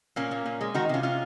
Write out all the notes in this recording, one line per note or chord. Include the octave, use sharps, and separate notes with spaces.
A#2 A#3 C#4
A#2
A#2
G#3
D#3 D#4 F#4
C3 C#4 F4
C3 C#4 F4